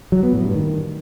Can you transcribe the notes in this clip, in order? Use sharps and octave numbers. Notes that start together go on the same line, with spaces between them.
F#3
B3
A2
G2
D#3